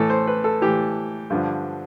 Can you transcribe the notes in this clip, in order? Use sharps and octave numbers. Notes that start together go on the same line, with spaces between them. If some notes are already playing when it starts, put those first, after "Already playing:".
Already playing: A2 E3 A4
C5
B4
A4
A2 E3 G4
G2 D3 F3